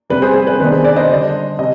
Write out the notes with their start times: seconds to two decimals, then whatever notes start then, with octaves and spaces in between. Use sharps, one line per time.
0.10 C3 G3 C4 B4
0.22 G#4 C5
0.35 G#4
0.47 B4
0.59 C3 D#3 B3 D4 B4
0.72 G#4 C5
0.84 B4 D5
0.96 C5 D#5
1.09 D3 G3 D4
1.59 C3 D#5